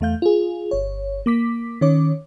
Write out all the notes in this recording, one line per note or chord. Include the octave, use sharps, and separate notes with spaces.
E2 A3 F5 G6
F4 G#4
G1 C#5
A#3 D6 B6
D#3 C#4 C#5 D6